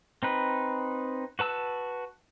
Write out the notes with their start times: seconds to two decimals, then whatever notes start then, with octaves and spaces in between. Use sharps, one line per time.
0.23 C4 D#4 B4
1.39 F#4 B4 A5 E6